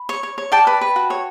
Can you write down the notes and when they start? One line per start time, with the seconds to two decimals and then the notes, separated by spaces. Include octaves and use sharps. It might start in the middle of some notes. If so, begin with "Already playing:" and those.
Already playing: B5
0.09 C#5
0.23 C#5
0.38 C#5
0.52 D5 G5 A5
0.67 B4
0.81 B4
0.96 F#4
1.10 C#5